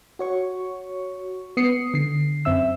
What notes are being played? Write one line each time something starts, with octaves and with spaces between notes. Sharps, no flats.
F#4 C#5 C#6
B3 D#6 C7 C#7
D3 C7
F#2 C4 E5 E6